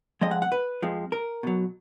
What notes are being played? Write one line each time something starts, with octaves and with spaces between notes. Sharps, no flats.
F2 F3 G#3 D#5
F#5
F#5
B4
F2 F3 G#3
A#4
B2 F#3